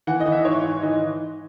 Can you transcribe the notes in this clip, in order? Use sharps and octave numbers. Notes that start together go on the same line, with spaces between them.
E3 F#5
D#5
E3
E5
G#2 C#5
G#2
E3 D#5